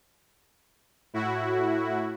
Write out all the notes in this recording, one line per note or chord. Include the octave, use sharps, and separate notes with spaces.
A2 E4 F#4